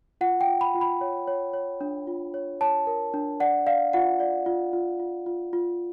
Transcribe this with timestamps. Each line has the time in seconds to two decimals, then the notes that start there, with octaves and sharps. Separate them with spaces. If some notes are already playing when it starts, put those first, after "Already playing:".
0.21 F4 F#5
0.41 G5
0.47 F4
0.61 B5
0.75 F4
0.81 B5
1.01 C#5
1.28 C#5
1.53 C#5
1.81 D4
2.07 F4
2.34 C#5
2.61 C#5 A5
2.87 A#4
3.14 D4
3.40 D5 F#5
3.66 D5 F5
3.93 F4 F#5
4.20 D5
4.46 F4
4.73 F4
4.99 F4
5.26 F4
5.53 F4